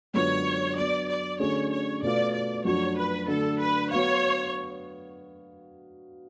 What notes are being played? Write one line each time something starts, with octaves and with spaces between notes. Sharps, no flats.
F#2 D3 G#3 B3 F4 C#5
F#3 B3 D4 D5
D5
D3 F#3 A3 C#4 G#4 C#5
C#5
B2 A3 F4 B4 D5 F5
D5
F#2 F3 A3 D4 F#4 C#5
B4
D3 F#3 A3 A4
B4
F#3 B3 F#4 B4 C#5 F5